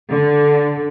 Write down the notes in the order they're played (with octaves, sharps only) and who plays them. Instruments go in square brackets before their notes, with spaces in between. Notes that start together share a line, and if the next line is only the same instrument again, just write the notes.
[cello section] D3